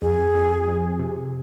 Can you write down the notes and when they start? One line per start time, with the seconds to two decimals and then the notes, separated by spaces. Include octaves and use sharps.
0.02 F2 G#4
0.35 F2
0.68 F2
0.99 C3